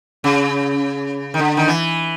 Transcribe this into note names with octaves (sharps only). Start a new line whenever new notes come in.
C#3
D#3
D3
D#3
E3